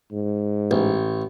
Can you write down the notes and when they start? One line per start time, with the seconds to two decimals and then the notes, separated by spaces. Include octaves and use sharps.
0.12 G#2
0.71 A1